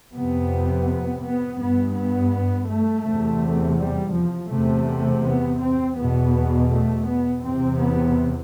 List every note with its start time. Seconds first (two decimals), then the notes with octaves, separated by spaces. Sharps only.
0.13 F2 C3 B3
1.22 B3
1.59 G2 B3
1.95 B3
2.68 A3
3.04 E2 C3
3.77 G3
4.14 F3
4.50 E2 C3 A3
5.24 B3
5.60 C4
5.96 E2 B2 B3
6.70 A3
7.06 B3
7.42 E2 C3 C4
7.79 B3